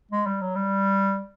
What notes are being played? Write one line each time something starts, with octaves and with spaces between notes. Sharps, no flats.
G#3
G3
F#3
G3